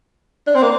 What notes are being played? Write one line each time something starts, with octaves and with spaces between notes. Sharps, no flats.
D4
C4
A#3